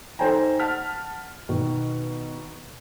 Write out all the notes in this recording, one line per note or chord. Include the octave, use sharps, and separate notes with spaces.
D#4 A4 C5 G5 G#5 A#5
F#5 A5 F6 B6
B2 D#3